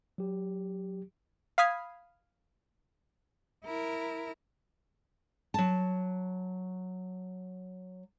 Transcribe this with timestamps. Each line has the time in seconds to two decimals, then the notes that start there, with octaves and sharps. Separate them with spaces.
0.18 F#3 G4
1.58 F5 B5 D#6 G#6 B6 C7
3.64 E4 A#4
5.54 F#3 A5